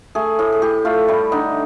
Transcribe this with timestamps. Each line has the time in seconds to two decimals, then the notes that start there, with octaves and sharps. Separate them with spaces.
0.15 A3 G#4
0.39 A2
0.52 G#4
0.62 A2 G4
0.85 A3 F4
1.08 G3 E4
1.32 D3 D#4